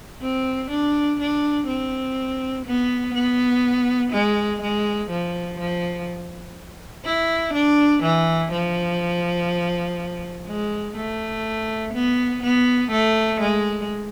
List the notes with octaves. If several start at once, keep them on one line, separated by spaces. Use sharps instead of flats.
C4
D4
D4
C4
B3
B3
G#3
G#3
F3
F3
E4
D4
E3
F3
G#3
A3
B3
B3
A3
G#3